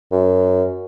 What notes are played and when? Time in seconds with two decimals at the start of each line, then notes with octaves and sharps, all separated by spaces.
0.12 F#2